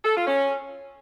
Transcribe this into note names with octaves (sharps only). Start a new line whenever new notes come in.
A4
F4
C#4